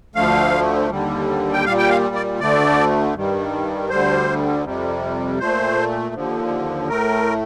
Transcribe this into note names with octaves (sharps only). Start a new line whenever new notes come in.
D2 D3 F3 A3 F5
D#2 D3 G3
G5
A#2 G3 F5
G5
F5
D5
D2 D3 A3 D5
G2 D#3 G3
D2 D3 G3 C5
F2 C3 G3
A#2 A3 C5
D#2 D3 F3
A2 A3 A#4